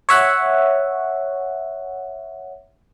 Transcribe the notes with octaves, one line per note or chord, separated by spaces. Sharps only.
C#5 E5 F#5